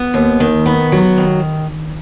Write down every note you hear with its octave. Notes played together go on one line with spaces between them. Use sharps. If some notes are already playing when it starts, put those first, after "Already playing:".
Already playing: B3
D#2
D#3
B3
F#3
D#3